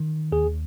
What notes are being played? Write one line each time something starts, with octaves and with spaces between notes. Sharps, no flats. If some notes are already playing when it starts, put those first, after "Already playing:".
Already playing: D#3
D#2 G#4